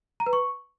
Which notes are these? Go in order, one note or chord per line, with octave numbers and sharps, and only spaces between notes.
A#5
B4
C#6